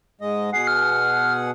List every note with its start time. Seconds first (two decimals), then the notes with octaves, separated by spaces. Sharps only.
0.21 G#2 G#3 D#5
0.53 B2 G#4 F#5 C7
0.67 F6